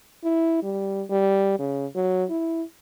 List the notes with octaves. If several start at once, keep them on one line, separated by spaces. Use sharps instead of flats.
E4
G3
G3
C#3
F#3
E4